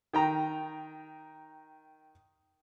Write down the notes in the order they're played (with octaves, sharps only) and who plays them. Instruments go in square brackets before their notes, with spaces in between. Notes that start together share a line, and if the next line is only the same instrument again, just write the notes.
[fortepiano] D#3 G5 A#5